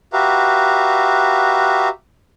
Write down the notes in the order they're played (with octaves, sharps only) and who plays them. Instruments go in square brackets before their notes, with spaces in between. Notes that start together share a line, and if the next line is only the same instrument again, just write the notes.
[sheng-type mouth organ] F#4 G4 B4 E5 F5 A#5